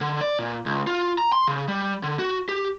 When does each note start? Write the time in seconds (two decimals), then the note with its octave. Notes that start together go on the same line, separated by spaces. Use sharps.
0.01 D3
0.21 D5
0.39 A#2
0.66 C#2
0.87 F4
1.18 A#5
1.33 C6
1.48 C#3
1.68 G3
2.03 D3
2.19 F#4
2.49 G4